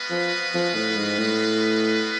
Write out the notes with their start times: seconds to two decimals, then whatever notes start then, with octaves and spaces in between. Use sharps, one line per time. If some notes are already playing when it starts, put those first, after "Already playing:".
Already playing: G#3 B3 F#4 B4 F5
0.10 F3
0.54 F3
0.75 A2
0.97 G#2
1.19 A2